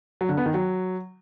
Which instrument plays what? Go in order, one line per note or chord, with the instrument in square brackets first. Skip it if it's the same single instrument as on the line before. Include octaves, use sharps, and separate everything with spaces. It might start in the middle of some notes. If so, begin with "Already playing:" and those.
[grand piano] F#3
D3
B3
D#3
F#3